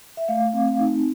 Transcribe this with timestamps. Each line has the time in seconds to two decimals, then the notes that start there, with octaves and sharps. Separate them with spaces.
0.17 E5
0.28 A3 F5
0.54 C4
0.80 D#4